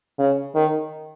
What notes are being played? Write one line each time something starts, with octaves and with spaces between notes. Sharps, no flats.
C#3
D#3